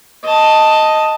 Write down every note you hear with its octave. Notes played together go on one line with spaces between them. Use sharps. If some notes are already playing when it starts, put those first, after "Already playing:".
D#5 A5